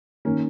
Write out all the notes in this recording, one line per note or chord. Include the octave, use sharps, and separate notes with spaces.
D#3 A#3 C#4